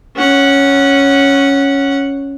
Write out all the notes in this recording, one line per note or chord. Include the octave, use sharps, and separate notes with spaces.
C#4 F#5